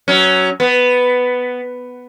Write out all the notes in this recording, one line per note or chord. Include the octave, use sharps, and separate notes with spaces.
F#3 C#4
B3